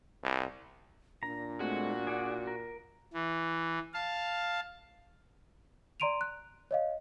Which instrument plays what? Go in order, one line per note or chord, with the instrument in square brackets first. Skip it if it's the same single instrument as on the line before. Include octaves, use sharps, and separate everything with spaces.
[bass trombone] C2
[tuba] A#2 [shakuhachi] D4 [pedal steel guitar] A#5
[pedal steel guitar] G#3 A3 C4 [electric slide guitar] F#4
[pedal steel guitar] G#4 D5 F#5
A#4
[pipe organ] E3
F5 A5
[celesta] D5 A#5 C6 D7 D#7 F7
F#6
C#5 D#5 F5